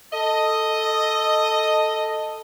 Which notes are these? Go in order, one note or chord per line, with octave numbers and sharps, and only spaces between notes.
A4 D#5